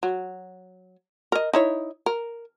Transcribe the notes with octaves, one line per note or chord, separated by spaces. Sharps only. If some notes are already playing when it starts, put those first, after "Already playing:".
F#3
A#4 D#5
D#4 E4 C#5
A#4